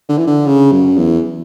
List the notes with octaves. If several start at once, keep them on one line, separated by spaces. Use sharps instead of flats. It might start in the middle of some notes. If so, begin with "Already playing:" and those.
D3
E3
D3
C#3
F#2
E2